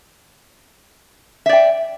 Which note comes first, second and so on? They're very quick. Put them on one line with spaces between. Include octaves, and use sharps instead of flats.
E5 D5 G5